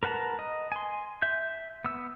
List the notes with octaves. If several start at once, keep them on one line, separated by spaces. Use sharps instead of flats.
A#4 B4 F#5 A5 A#5
D#5
G#5 C6
E5 G6
B3 E6